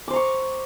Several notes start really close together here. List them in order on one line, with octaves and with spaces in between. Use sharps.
D6 C5 A#5 C#6